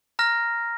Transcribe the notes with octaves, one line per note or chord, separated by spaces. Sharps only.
A#5 F6 A#6